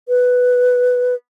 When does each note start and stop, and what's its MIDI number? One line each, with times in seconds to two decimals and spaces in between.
0.09 1.15 71